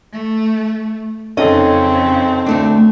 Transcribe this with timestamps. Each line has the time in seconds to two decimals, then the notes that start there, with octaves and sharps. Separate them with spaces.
0.12 A3
1.37 F2 C#3 C4 C#4 D#4 A4 D#5
2.46 D2 A3 D4